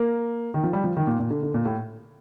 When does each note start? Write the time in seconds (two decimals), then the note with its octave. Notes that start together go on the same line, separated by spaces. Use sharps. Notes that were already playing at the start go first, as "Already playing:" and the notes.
Already playing: A#3
0.54 D#3
0.63 F3
0.73 G3
0.84 F3
0.97 D#3
1.07 A#2
1.20 A#2
1.30 D3
1.43 D3
1.54 A#2
1.65 A2